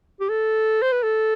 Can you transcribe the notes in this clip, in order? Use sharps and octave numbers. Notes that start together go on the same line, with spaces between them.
G4
A4
C5
B4
A4